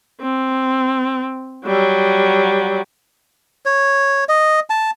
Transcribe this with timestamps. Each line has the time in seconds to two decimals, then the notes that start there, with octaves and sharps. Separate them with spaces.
0.22 C4
1.66 F#3 G3
3.66 C#5
4.29 D#5
4.70 A5